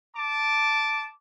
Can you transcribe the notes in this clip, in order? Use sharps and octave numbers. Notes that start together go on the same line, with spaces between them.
A5 D6